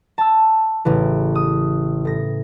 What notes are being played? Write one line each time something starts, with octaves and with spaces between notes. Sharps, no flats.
A5 E6
A1 C#3 E3
D#6
A2 A#6